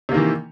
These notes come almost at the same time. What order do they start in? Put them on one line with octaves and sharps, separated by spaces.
C3 A#3 D#3 E3